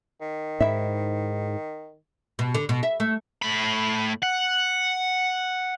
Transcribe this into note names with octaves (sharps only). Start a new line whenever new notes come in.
D#3
G#2 E4 E5
B2
D3
B2
E5
A3
A2 B5
F#5